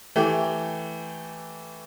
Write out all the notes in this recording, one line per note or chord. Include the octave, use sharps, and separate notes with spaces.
E3 A3 G4